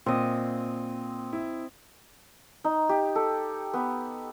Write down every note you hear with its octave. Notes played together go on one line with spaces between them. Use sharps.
A#2 C4 D#5
E4
D#4
G4
A4
B3